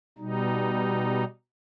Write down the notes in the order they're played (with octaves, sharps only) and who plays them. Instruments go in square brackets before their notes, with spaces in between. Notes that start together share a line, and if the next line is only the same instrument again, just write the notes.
[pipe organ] B2 G3 D#4